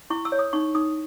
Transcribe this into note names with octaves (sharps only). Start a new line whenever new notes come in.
E4 C#6
E6
C#5
D#6
D#4 C#6
D#4 D#6